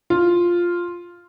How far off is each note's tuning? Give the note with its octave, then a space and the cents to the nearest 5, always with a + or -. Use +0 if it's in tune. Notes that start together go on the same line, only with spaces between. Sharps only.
F4 +0